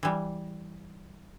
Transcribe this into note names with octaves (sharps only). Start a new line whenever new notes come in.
E3 G3